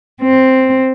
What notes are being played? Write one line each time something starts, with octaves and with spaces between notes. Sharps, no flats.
C4